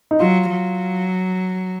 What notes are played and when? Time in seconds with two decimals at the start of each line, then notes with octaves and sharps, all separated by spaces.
0.11 D#4
0.20 F#3 F4
0.50 F#3